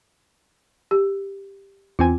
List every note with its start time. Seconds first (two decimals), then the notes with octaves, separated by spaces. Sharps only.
0.91 G4
1.99 E2 C4 F4 G#5